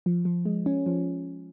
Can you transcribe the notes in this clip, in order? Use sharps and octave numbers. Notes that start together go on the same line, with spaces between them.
F3
F3
G#3
C#4
F3